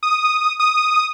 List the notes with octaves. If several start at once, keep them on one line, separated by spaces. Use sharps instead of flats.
D#6
D#6